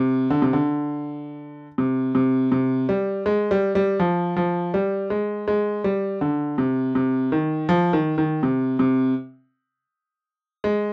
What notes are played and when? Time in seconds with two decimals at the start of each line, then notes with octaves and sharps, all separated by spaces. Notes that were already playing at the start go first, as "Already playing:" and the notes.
Already playing: C3
0.30 D3
0.42 C3
0.53 D3
1.78 C3
2.15 C3
2.52 C3
2.89 G3
3.26 G#3
3.51 G3
3.75 G3
4.00 F3
4.37 F3
4.74 G3
5.10 G#3
5.48 G#3
5.84 G3
6.21 D3
6.58 C3
6.95 C3
7.32 D#3
7.69 F3
7.93 D#3
8.18 D#3
8.43 C3
8.79 C3
10.64 G#3